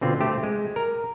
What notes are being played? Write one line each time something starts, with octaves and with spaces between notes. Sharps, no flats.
B2 D3 C4 F4
A3 G4 C5
G#3
A#4